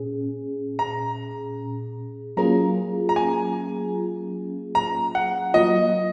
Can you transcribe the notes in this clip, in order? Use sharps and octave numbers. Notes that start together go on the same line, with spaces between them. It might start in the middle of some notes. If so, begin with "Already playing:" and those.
Already playing: A#2 C#4 G#4
A#5
F#3 A#3 C#4 F4 G#4 A#5
A#5
G#5
A#5
F#5
F#3 A#3 F4 D#5